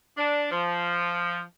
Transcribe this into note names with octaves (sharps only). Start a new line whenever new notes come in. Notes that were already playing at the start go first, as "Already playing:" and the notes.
D4
F3